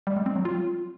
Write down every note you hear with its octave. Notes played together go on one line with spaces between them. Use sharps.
G3
G#3
C4
F#3
F4